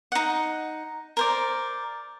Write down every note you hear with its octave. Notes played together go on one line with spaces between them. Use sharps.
D#4 F#5
A#4 C5 D5